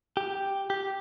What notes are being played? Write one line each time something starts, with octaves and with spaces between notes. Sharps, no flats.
G4
G4